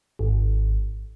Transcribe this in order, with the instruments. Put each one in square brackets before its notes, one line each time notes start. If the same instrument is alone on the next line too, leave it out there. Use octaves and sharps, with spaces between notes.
[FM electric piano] G#1